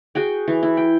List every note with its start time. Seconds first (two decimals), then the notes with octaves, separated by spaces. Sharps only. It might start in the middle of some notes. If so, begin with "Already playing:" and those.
0.15 F#4 G#4 G5
0.48 E3
0.63 E4
0.77 G5